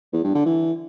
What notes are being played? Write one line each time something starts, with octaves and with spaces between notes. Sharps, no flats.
E2
G2
D3
E3